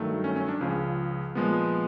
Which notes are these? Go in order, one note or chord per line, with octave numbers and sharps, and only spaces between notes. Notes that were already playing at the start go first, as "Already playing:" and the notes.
Already playing: G2 D#3 F#3 A3
C#4
C#4
D4
C#2 C#3 F3 C#4
A#2 F3 G#3 B3